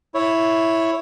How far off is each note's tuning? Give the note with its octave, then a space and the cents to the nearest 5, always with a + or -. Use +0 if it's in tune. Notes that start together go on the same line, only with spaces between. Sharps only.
E4 +0 C#5 +0